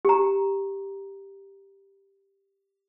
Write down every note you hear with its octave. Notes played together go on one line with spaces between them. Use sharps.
G4 A#5